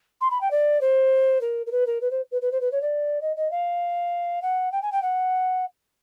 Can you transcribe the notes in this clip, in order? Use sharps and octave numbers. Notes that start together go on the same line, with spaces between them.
C6
B5
G5
D5
C5
A#4
A#4
B4
A#4
B4
C5
B4
B4
C5
B4
C#5
D5
D#5
D#5
F5
F#5
G5
G#5
G5
F#5